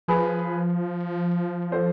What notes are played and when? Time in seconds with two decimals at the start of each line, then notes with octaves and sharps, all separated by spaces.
0.08 F3 G#4 B4
1.72 A4 C5